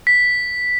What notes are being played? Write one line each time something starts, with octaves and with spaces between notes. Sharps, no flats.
B6